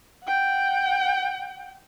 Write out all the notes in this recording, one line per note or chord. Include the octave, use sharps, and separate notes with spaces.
F#5 G5